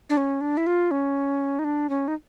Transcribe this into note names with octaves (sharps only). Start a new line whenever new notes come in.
D4
C#4
D4
E4
F4
C#4
D#4
D4
C#4
D#4